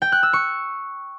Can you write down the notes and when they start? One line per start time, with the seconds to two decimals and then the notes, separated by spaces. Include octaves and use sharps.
0.02 G5
0.12 F#6
0.23 E6
0.33 C#6